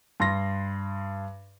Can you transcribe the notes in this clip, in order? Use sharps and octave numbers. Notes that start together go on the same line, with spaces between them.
G2 C6 A#6